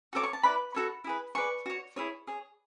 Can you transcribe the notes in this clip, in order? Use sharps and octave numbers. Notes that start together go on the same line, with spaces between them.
F#4 A4 C#5 D6
C#6
A5
E4 B4 D5 B5
F#4 A4 C#5
E4 G#4 B4
G#4 B4 D5 C#6
F#4 C#5
E4 G#4 C#5
G#4 C#5